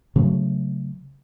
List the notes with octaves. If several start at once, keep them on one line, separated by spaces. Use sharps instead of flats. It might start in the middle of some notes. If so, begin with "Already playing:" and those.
C#3 F#3 A3